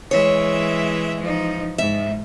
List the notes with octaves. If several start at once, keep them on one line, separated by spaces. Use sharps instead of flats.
E3 G#3 C#5 E5
F3 D#4
G#2 E5